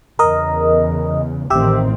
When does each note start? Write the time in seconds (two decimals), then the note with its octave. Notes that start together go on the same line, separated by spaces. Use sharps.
0.19 E2 C#3 A#4 D#5
1.50 A1 D#3 C4 G4 E5